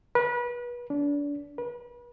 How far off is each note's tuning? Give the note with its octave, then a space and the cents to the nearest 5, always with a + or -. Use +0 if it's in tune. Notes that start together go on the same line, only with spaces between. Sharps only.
B4 -30
D4 -30
B4 -35